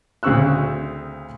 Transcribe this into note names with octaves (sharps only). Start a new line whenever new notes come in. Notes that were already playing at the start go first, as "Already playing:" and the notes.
D2 C#3 C4 C#6 E6 F#6